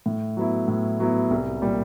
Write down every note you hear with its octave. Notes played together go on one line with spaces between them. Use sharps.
A2
F#3 B3 E4
A2
F#3 B3 E4
C2
A#2 G3